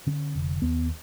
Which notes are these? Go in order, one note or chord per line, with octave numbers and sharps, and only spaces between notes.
D3 C#4
F1
D#2 B3